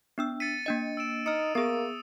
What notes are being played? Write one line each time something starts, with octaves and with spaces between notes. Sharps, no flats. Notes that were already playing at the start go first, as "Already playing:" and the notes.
B3 D4 E6
A6 B6 C#7 D#7
A#3 D4 D#5
E6 D7 E7
D#4 D#6 F6 C#7
A#3 B3 G#4 D#6